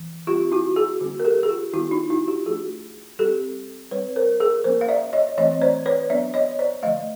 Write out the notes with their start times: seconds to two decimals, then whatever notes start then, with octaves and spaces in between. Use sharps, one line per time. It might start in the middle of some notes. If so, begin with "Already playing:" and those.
Already playing: E3
0.27 G3 C4 F4 G4
0.52 E4 F#4
0.76 F#4 G#4
1.00 D3 G3 A#3 C#4 F#4 G#4
1.20 A#4
1.25 G4 A4
1.43 G#4
1.49 F4 G4
1.73 D#3 G3 B3 E4 F#4
1.91 D#4 F4
2.10 E4 F#4
2.28 F4 G4
2.46 F3 A3 D4 F#4 G#4
3.19 G3 C4 G4 A4
3.91 G3 C4 B4 C#5
4.16 A#4 C5
4.40 G#4 A#4
4.64 F3 A#3 C#4 A#4 C5
4.81 F5
4.88 D5 E5
5.13 C#5 D#5
5.37 E3 A3 C4 C#5 D#5
5.62 C5 D5
5.86 B4 C#5
6.10 F#3 B3 D4 D5 E5
6.34 C#5 D#5
6.59 C5 D5
6.83 D3 F3 A3 D#5 F5